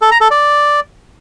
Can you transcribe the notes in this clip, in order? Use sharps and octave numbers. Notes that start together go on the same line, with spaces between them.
A4
A#5
A4
D5